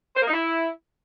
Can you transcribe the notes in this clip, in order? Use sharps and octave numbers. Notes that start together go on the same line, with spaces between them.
C5
A#3
D#4
E4